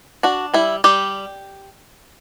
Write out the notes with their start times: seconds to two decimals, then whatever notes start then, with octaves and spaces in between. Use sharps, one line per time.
0.23 D4 F#4
0.54 G3 E4
0.84 G3 G4